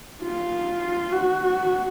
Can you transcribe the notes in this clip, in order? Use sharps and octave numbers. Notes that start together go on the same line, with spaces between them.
F4
F#4